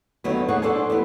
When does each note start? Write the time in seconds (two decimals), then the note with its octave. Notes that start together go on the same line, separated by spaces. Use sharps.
0.24 D#2 D3 F#3 B3
0.49 G#4 A4 C#5 F5 F#5
0.62 D4 A4 C5 D5 G#5
0.90 E3 G3 B3